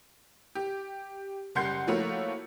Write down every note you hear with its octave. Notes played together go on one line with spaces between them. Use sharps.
G4
F#1 G3 F#5 C6 G6 C7
F3 A3 A#3 E4 F#4 C#5